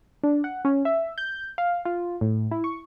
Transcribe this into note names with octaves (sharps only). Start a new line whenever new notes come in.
D4
F#5
C#4
E5
G6
F5
F4
A2
E4
C#6